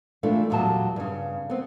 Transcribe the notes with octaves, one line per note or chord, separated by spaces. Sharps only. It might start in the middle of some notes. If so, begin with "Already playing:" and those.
C3 E3 A3 D4 F4
E2 A#2 F#3 G3 A5
G2 C#3
B3 C4